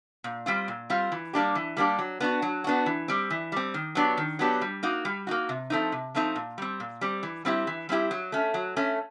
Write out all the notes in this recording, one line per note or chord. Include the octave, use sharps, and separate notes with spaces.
A#2
G3 C4 F4
A#2
G3 C4 F4
E3
G3 A#3 D4 G4
E3
G3 A#3 D4 G4
F#3
B3 D4 F#4
F#3
B3 D4 F#4
E3
G3 C4
E3
G3 C4
D#3
F#3 B3 D4 G4
D#3
F#3 B3 D4 G4
G3
A#3 D#4 F#4
G3
A#3 D#4 F#4
C3
F3 A3 C4 D#4
C3
F3 A3 C4 D#4
A#2
G3 C4
A#2
G3 C4
E3
G3 C4 E4 G4
E3
G3 C4 E4 G4
F#3
A3 C#4
F#3
A3 C#4